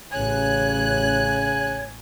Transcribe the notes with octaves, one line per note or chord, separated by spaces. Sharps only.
A1 C#3 C#5 G#5 F#6